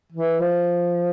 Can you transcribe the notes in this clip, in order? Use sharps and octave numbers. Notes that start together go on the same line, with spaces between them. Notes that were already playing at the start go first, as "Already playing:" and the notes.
E3
F3